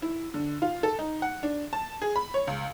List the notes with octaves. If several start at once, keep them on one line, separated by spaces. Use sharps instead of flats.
E4
D3
F4
A4
D#4
F#5
D4
A5
G#4
B5
C#5
C#2